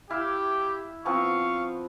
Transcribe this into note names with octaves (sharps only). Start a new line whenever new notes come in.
E4 G4 E5 F5
F3 B3 C4 F5 C#6